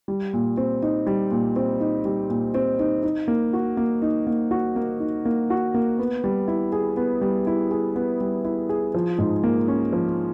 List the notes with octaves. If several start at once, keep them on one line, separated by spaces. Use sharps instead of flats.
G3
A#2
C4
D#4
G3
A#2
C4
D#4
G3
A#2
C4
D#4
D#4
A#3
F#4
A#3
D#4
A#3
F#4
A#3
D#4
A#3
F#4
A#3
B3
G3
E4
G#4
B3
G3
E4
G#4
B3
G3
E4
G#4
F3
G#2
A#3
C#4
F3